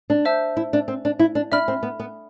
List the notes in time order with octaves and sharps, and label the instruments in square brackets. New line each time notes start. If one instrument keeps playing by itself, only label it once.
[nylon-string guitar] D4
[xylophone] C5 E5 A5 E6 G6
[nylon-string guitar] E4
D4
C4
D4
E4
D4
[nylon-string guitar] D4 [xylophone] E5 B5 F6
[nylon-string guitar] C4
B3
B3